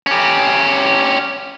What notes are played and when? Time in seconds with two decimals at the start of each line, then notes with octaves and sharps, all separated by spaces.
0.07 C#4 G4